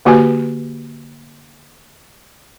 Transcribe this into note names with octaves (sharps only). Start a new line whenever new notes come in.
D3 A#3 F#4 G4 B4 G#5